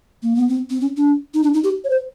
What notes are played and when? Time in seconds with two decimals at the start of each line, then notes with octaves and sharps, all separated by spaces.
0.23 A#3
0.36 B3
0.49 C4
0.70 C4
0.81 C#4
0.97 D4
1.34 D#4
1.43 D4
1.54 D#4
1.64 G4
1.84 C#5
1.90 C5